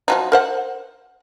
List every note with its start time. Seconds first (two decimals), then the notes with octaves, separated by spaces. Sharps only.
0.08 F3 F#3 D#4
0.32 A#4 C5 F#5